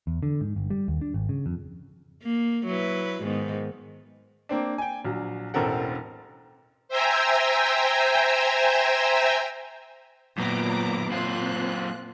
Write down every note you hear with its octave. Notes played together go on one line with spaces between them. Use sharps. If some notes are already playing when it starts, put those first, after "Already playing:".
E2
D3
G#2
G1
G3
D#2
D4
G#1
C#3
F2
A#3
F#3 E4 B4
G#2 D#3 B3
A#3 C4 D4
G5 G#5
A#1 F#3
E1 A1 C4 A4 A#4 F#5
C5 E5 G5 G#5 A#5 E6
F#2 A#2 B3 A#5 D6
F#2 A#2 C4 F4 F#6